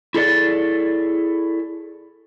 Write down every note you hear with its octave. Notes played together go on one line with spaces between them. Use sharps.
E4 G#4 A4 D5